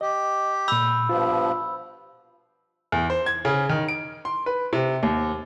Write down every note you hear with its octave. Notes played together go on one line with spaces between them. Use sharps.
G4 D#5
A#2 B5 E6 G6
G2 B2 F3 F4
E2
C5
G#6
C#3
D#3
D7
C6
B4
C3
D#2